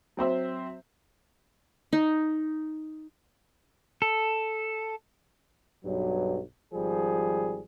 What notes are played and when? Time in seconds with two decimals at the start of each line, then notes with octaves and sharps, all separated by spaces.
0.17 F#3 C4 C5 E5
1.93 D#4
4.02 A4
5.85 B1 G2 F#3
6.73 G#1 F3 G3 G#4